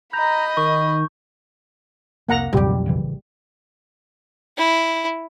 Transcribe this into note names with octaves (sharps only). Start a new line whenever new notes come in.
D#5 A#5 B5 G6
D#3 C#6
F1 C2 A#3 F#5 A#5
B1 F2 A2 C#3 G3 G4
A1 C#3 E3
E4